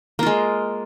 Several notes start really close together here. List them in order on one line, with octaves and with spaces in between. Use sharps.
A#3 F4 G#3